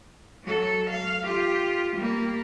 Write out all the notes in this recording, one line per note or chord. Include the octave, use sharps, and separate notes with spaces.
F#3 A4
F5
F4 G4
G3 A#3